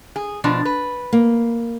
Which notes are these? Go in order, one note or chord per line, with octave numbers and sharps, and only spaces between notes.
G#4
B2 F3 D4
B4
A#3